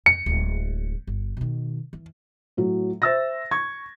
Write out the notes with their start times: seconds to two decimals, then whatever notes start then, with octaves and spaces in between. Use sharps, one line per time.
0.06 F2 C#7
0.26 D1 G#3
1.07 G1
1.37 B2 D#3
1.93 E3
2.57 A2 F#3
3.02 C5 E5 E6 A6 A#6
3.51 C#6 G#6